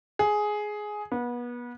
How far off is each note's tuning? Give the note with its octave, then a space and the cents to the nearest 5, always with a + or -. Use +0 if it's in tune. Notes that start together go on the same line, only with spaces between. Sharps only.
G#4 +10
B3 -30